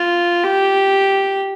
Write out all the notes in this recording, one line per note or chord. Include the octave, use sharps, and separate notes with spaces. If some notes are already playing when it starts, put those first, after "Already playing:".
Already playing: F4
G4